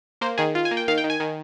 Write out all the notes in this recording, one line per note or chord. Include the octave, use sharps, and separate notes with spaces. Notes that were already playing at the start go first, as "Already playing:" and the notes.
A#3 C5
D#3 G#4
F4
G#5
A#3
G5
D#3 F5
G5
D#3
G#5
D#3